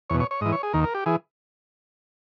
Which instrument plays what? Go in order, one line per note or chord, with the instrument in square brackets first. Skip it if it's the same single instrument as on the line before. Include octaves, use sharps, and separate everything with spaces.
[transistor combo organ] E2 B2 C#5
C#5
C#5
G#2 E3 D#5
C#5
G#4
D#2 D#3 A#4
A#4
G4
E3 G#4